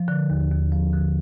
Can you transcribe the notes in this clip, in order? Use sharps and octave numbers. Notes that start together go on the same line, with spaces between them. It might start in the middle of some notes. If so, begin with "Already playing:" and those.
Already playing: F3
D3
D#2
D#2
F3
D3